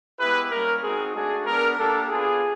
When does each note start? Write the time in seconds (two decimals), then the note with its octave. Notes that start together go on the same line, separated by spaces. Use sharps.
0.18 G#3 B3 E4 G4 B4
0.50 G3 A#3 C#4 A#4
0.82 G#3 C4 D#4 F#4 G#4
1.14 A3 D4 F#4 G#4
1.46 G#3 B3 D4 A#4
1.78 A#3 D4 G4 A4
2.09 B3 D4 F4 G#4